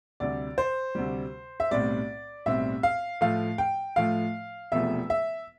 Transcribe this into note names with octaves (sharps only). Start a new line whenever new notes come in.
D2 C3 G3 D5
C5
D2 C3 G3
E5
B1 A2 G3 C4 D5
B1 A2 G3 C4 E5
F5
A2 F3 A3 F5
G5
A2 F3 A3 F5
E1 E2 C3 F3 A3 E5
E5